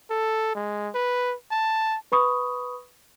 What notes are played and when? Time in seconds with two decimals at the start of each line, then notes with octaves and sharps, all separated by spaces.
0.10 A4
0.55 G#3
0.95 B4
1.51 A5
2.12 B4 B5 C#6 D#6